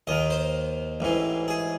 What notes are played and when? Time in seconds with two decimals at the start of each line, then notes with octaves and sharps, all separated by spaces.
0.07 D#2 D#3 D#5
0.30 C5
1.00 A1 G#2 E3
1.48 G#4